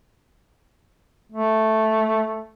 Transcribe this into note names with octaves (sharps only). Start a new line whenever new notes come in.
A3